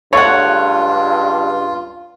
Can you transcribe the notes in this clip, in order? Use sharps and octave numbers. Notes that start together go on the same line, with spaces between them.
C#2 G2 A3 F4 C#5 F#5